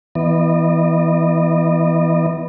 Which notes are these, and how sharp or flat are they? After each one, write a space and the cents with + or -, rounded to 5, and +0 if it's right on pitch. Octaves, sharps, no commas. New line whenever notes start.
E3 +0 B3 +0 D#5 -40